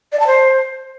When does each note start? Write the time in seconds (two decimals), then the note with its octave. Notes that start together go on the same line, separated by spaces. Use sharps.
0.12 D5
0.20 A5
0.27 C5